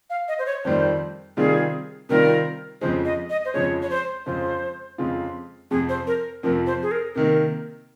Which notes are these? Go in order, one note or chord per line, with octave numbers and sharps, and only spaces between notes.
F5
D#5
C5
C#5
F2 D#3 G3 C4 C5
C3 D#3 G3 C4 F4 G#4
C3 D#3 G3 C4 F4 A#4
F2 C#3 F3 G#3 C5
D#5
D#5
C5
F2 C#3 F3 G#3 C#5
C#5
C5
F2 C#3 G#3 C4 F4 C5
F2 C#3 G#3 C4 F4
F2 C3 F3 C4 G#4
C5
A#4
F2 C3 F3 C4 A#4
C5
G#4
A#4
C3 D#3 A#3 A#4